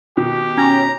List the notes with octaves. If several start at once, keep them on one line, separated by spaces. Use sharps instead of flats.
B2 D#3 G4
C#4 A#5